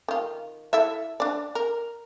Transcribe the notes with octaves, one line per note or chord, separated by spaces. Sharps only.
D#3 F4
E4 A4 E5
D4 D5
A#4